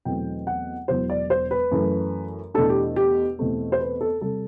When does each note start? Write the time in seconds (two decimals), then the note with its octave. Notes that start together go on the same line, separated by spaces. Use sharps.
0.05 E2 B2 F#3 A3 C4 G5
0.47 F#5
0.88 E1 E2 B2 F#3 C5
1.10 D5
1.30 C5
1.51 B4
1.71 F#2 E3 A3
2.54 E2 B2 A3 D4 A4
2.69 G4
2.96 G4
3.39 E2 B2 A3 C4
3.72 C5
3.80 B4
4.01 A4
4.21 C3 G3 A4